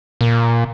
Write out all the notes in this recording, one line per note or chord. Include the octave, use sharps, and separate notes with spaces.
A#2